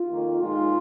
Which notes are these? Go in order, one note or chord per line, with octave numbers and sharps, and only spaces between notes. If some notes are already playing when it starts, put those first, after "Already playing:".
Already playing: F4
F2 D#3 A#3
A#2 G#3 D#4 F4